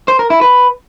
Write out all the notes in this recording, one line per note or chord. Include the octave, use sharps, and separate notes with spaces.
C5
A#4
E4
B4